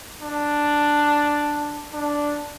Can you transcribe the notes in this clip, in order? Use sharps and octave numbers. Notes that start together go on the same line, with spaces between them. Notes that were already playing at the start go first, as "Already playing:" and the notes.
D4
D4